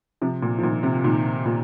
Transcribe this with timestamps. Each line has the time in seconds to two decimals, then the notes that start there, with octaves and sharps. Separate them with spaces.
0.22 C3 F3
0.42 A#2
0.59 F3
0.63 A#2 D#3
0.83 C3
1.04 A#2 D#3
1.46 A#2